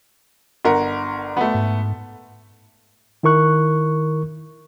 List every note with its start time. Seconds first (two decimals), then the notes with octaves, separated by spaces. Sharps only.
0.65 G1 A#4 F#5
1.37 A3 B3
1.55 G#2
3.23 D#3 E4 A#4 C#6 F#6